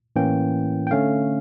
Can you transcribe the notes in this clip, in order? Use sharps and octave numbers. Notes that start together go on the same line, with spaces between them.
A2 E3 A#3 C#4 G5
G5
D3 A3 C#4 F5